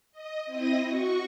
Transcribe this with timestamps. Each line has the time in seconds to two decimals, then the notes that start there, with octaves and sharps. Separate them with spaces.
0.12 D#5
0.46 C4 E4 D#5 D#6 A#6
0.86 F#4 C#6